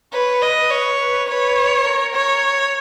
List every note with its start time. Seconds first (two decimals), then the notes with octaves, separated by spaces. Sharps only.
0.13 B4 C#5
0.42 B4 D#5
0.70 C#5
1.00 B4
1.28 B4 C#5
1.85 A#4
2.14 C#5